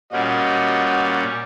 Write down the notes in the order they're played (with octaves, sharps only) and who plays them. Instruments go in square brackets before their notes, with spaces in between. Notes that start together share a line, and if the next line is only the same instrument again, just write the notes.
[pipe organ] A#2 G3 C#4 [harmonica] F#4 D#5 F#5